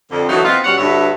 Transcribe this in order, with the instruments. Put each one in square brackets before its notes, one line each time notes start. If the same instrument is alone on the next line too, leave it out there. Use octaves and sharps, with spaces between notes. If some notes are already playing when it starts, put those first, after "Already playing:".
[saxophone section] F2 D3
D3 E3 F#3 A3 B3 D#4
B3 C4 D#4 F4
B2 G3 C#4 C#5 F#5
D2 G2 B4 C#5 E5